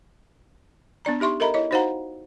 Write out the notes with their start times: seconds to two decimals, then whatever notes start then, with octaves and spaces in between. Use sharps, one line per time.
1.05 B3 D4 D5 A#5
1.20 D#4 G4 E5 C6 C#6
1.40 A4 A#4 D#5 E5 A#5 B5
1.54 E4 C#5 D#5
1.71 D#4 F#4 C5 F5 F#5 A#5